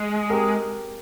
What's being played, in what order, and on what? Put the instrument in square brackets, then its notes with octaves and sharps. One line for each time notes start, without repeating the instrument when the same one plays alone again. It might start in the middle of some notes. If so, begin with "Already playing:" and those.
Already playing: [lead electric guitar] G#3 [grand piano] G#4
[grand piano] G4 A#4